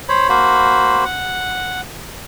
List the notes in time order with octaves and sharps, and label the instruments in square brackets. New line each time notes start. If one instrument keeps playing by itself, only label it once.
[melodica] C5 C#5 B5
A#3 F#4 C5 B5
F#5